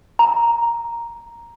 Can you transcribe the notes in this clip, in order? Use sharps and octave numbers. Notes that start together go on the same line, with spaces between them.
A#5